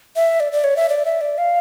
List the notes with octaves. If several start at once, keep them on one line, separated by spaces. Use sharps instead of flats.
E5
D5
D5
C#5
E5
D5
E5
D5
F5